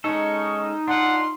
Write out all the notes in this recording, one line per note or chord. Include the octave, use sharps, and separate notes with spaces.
G#3 C#4 D#4 A4 C#6
D4 F4 F#5 C6